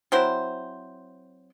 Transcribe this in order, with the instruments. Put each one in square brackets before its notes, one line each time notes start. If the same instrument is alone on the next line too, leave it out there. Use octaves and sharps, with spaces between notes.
[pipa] F#3 C4 E4 C5